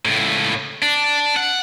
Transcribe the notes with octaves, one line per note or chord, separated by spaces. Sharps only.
C#2 A2
D4
F#5